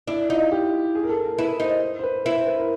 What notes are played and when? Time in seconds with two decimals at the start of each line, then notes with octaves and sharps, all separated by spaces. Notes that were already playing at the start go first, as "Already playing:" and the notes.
0.07 D4 E4
0.29 D#4 F4
0.52 G4
0.95 G#4
1.03 A#4
1.09 A4
1.24 A#4
1.38 E4 B4
1.60 D#4 C5
1.99 C5
2.03 B4
2.25 E4 B4
2.36 C5
2.47 B4
2.58 A#4